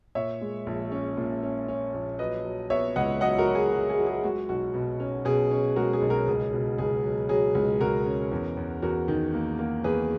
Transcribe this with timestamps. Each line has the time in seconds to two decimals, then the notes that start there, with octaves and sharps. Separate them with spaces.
0.15 A#2 C#5 E5
0.41 G#3
0.66 A#1
0.92 C#4
1.17 A#2
1.43 C#4
1.68 C#4
1.94 A#1
2.19 F#3 B4 D#5
2.44 F#3
2.70 B3 C#5 E5
2.96 C#2 D#5 F#5
3.21 F#3 D#5 F#5
3.38 F#4 A#4
3.47 F#3
3.55 G#4
3.72 F#3 F#4
3.89 G#4
3.98 F#3
4.06 G#4
4.23 G#3 F#4
4.49 B1 F#4
4.74 B2
5.00 C#4
5.25 B2 G#4
5.51 C#4
5.76 G#3 F#4 A#4
5.93 G#4
6.02 B1
6.10 F#4 A#4
6.27 C#2 G#4
6.53 B2
6.78 C#2 G#4
7.04 F#3
7.29 F#3 G#4
7.55 C#2
7.81 C#2 F#4 A#4
8.06 C#4
8.32 E2
8.57 E2
8.82 E2 F#4 A#4
9.08 D#3
9.34 A#3
9.59 A#3
9.84 E2 G#4 B4